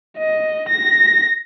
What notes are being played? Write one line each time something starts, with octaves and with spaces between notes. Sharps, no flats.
D#5
A#6